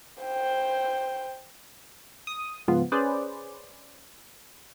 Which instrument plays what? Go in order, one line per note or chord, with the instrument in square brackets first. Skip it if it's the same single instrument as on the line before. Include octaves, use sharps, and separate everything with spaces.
[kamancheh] C5 G5
[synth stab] D#6
G#2 C#3 F3 B3 F4
C#4 G#4 B4 C5 D5